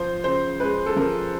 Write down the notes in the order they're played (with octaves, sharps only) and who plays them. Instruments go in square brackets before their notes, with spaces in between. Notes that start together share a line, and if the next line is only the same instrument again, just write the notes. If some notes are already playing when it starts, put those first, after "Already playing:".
Already playing: [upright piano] F3 C5
C#3 C5
G#3 B4
A4
F3 A#4